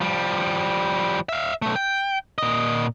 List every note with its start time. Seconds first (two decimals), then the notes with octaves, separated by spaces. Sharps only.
0.01 F3 G3
1.29 E5 F5
1.62 B1 A3
1.76 G5
2.38 A#2 D#5